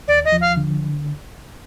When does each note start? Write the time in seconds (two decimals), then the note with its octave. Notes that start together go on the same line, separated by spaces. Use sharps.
0.08 D#2 D5
0.25 D#5
0.32 F3
0.41 F5
0.57 D3